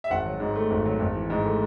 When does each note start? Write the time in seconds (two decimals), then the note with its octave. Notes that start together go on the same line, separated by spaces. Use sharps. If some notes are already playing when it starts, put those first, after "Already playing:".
0.04 E5
0.10 G#1 F#5
0.26 F#3
0.40 G#2
0.56 A3
0.70 G#1
0.85 F#3
1.00 G#1
1.15 E3
1.30 G#2
1.44 A3